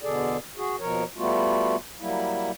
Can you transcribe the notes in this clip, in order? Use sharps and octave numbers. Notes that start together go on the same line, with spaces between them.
E2 B2 D3 G#4 A4 D5
F#4 G#4
D#2 B2 F3 A#4 C#5
G3 A3 B3 F4 F#4
F#3 G3 A#3 E4